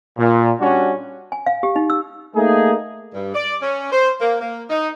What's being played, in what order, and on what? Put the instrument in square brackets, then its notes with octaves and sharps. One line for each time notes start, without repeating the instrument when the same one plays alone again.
[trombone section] A#2
G3 C#4 D4 F#4
[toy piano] G#5
F5
G4
D#4
E6
[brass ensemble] A3 A#3 D#4 G#4
[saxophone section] G2
D5
C#4
C5
A#3
A#3
D#4